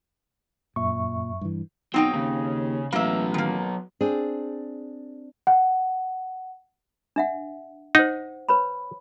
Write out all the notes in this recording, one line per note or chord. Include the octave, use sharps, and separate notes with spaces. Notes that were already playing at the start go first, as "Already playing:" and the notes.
F#2 A#2 E5 C#6
G2 E3
B1 F#3 C4 D#4 G5
D#2 C#3
A1 F#3 A#3 B3 E5
D#3 A#3
C4 D4 G#4
F#5
D4 E5 F#5
D#4 C5 F#5
B4 C#5 B5